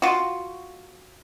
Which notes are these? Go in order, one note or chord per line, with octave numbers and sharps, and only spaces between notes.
F4 F#4